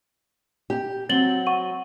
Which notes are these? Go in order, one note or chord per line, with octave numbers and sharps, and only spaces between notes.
G4
F#3 C4 A6 F#7 G7
F#5 C#6 D#7